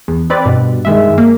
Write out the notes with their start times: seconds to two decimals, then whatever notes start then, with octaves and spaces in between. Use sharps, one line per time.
0.08 E2
0.30 C4 B4 D5
0.45 G2 B2
0.85 D#3 G#3 E5
1.18 A#3